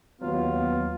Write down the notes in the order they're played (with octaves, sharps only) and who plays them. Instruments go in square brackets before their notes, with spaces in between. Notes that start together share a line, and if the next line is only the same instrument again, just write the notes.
[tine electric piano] D#2 F#3 [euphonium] B3 [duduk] F4